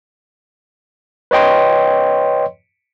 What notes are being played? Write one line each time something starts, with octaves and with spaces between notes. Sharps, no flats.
B4 C#5 D#5 G5 C6